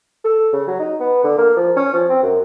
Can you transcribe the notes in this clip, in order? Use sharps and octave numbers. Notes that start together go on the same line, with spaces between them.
A4
C#3
F#3
D#4
B3
D3
A#3
F3
C#4
F3
C4
F#2